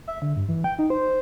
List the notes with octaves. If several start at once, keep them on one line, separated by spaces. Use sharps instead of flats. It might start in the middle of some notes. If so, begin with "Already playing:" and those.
E5
D3
G2
E3
G5
D#4
C5